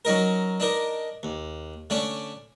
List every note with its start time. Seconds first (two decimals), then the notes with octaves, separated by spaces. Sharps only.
0.05 F#3 C#4 D#4 A#4
0.60 D4 D#4 A#4
1.23 D#2
1.90 D3 A3 C#4 D4